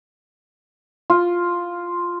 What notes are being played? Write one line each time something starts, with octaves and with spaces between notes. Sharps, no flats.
F4